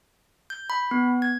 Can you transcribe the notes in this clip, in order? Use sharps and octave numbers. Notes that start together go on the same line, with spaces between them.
G6
B5
B3
G#6